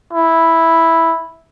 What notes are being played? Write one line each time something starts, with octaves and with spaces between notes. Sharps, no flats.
E4